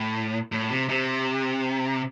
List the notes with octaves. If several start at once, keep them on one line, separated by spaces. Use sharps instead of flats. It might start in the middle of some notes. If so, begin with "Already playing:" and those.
Already playing: A2
A2
C3
C3